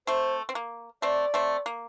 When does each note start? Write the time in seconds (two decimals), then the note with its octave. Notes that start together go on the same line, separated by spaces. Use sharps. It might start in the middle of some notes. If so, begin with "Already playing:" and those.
0.07 A3 C4 C5
0.49 C4
0.55 A#3
1.02 A3 C4 D5
1.34 A3 C4
1.66 A#3